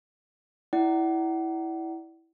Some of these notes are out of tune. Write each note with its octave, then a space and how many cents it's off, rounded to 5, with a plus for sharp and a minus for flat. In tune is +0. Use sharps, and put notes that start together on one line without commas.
E4 -10 D5 +0 F#5 +30